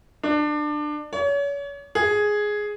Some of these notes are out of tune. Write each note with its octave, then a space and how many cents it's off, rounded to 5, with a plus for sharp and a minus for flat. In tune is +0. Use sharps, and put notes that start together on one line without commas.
D4 +25
C#5 +35
G#4 +5